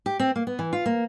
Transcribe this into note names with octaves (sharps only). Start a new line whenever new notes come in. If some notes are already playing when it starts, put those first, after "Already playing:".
G4
C4
A#3
B3
E3
F4
A#3